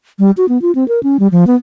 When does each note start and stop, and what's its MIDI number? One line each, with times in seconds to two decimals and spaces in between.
0.19 0.31 55
0.37 0.46 66
0.49 0.61 59
0.62 0.71 65
0.75 0.87 60
0.88 1.00 70
1.03 1.17 61
1.20 1.27 55
1.32 1.47 53
1.47 1.55 59